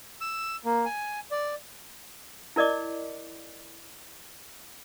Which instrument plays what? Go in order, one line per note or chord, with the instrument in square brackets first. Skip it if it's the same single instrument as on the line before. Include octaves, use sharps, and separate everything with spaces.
[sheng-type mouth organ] E6
A#3
G#5
D5
[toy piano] E4 A#4 D5 D#5 D6